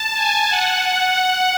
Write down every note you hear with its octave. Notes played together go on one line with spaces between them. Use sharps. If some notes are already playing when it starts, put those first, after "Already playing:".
Already playing: A5
G#5
F#5